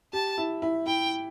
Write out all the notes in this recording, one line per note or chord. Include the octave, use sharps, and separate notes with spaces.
G4 A5
E4
E4
E4 G5